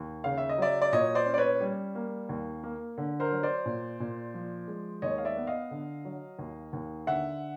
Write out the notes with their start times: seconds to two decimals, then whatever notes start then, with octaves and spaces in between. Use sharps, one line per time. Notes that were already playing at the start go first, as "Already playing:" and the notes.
Already playing: D#2
0.24 C#3 F5
0.38 E5
0.49 D#5
0.58 F#3 D5 E5
0.82 D5
0.93 A#2 C#5 D#5
1.15 C5 D5
1.26 C#4
1.34 D5
1.38 B4 C#5
1.60 G3
1.95 A#3
2.29 D#2
2.63 A#3
2.98 D3
3.20 A#4 C5
3.31 F#3
3.43 C5 D5
3.66 A#2
4.00 A#2
4.34 F3
4.68 G#3
5.02 D#2 C#5 D#5
5.18 F5
5.25 D5 E5
5.37 B3
5.47 D#5 F5
5.71 D3
6.05 F#3
6.39 D#2
6.73 D#2
7.07 D3 E5 F#5